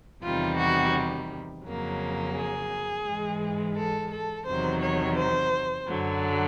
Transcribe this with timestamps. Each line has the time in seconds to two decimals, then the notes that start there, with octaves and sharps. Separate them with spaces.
0.23 E2 C3 D#3 G3 F4
0.59 F#4
1.64 F2 C#3 F#3 A#3
2.35 G#4
3.05 G#2 E3 G#3
3.76 A4
4.11 A4
4.47 E2 C3 D#3 F#3 C5
4.81 C#5
5.17 C5
5.87 F#2 D3 F#3